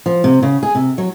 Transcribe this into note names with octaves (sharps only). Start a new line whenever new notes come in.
F3
C3
C#3
G#4
C3
F#3